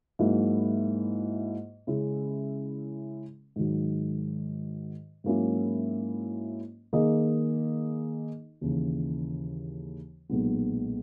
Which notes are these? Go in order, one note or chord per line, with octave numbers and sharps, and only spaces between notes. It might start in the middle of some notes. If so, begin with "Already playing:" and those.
G#2 F#3 A#3 E4
C#3 G#3 C#4 E4
G#2 D#3 F#3
G#2 F#3 A#3 C#4 E4
D#3 A#3 D#4 G#4 D#5
D#2 C#3 E3
B1 A#2 G#3 B3